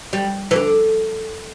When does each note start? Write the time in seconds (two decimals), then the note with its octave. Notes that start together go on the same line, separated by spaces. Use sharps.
0.13 G3
0.51 E3
0.56 D3